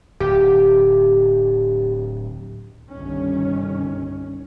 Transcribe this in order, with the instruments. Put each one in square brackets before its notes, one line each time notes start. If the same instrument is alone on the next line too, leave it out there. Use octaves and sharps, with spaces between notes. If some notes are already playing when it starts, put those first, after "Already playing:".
[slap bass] D1 [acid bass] G4
[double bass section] G1 C2 D#3 C#4